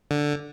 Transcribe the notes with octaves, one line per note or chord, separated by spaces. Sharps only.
D3